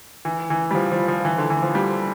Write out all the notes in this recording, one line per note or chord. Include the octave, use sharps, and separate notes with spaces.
E3
E3
G3
F3
F3
F3
E3
D3
E3
F3
G3